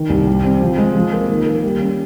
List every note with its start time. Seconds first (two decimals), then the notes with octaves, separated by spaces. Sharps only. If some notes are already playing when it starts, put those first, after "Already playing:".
Already playing: D#3
0.10 C2
0.27 G3
0.44 C4
0.61 F3
0.78 G#3
0.95 F3
1.13 A#3
1.29 D#3
1.46 A#3
1.64 G3
1.81 C#4